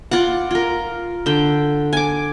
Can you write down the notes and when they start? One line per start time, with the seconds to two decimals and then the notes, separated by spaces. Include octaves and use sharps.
0.11 F4 D5 F#5
0.51 F4 A#4
1.26 D3 G5
1.93 G#5 D6